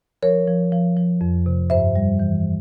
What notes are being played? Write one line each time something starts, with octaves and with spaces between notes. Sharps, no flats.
F3 A#4 C#5
F3
F3
F3
F2
C3
G2 C5 E5
G3
E3